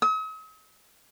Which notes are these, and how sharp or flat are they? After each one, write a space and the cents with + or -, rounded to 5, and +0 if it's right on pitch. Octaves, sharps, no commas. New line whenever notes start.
D#6 +45